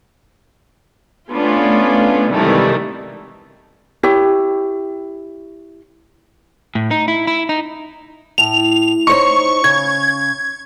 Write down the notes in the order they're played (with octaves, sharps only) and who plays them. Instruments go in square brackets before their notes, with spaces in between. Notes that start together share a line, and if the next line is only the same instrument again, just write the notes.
[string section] A3 B3 C#4 D4 F4
G#2 C3 D#3 E3 G3 A3
[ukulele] E4 G4 C#5 G5
[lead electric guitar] A2
D#4
E4
E4
D#4
[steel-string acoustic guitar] A2 [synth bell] F7
[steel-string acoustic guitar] D#4 C5 C#5 [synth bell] C#6
[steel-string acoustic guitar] C#3 [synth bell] G#6